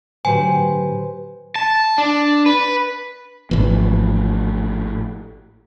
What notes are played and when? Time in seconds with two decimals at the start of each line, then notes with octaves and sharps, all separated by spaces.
0.25 A2 D3 F#3 G4 B4 C5 G#5
1.56 A5
1.98 D4
2.46 B4
3.51 G#1 A2 E3 F3 A#3